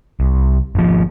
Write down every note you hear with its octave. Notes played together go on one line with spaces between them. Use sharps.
C2
G#1 F3